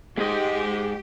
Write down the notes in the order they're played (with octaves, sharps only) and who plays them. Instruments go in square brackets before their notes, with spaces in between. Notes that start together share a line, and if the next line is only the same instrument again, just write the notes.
[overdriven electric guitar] G#2 D#5 [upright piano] G#3 [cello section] G4